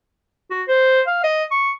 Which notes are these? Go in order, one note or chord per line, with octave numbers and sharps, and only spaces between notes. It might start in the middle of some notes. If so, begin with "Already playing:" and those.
F#4
C5
F5
D#5
C#6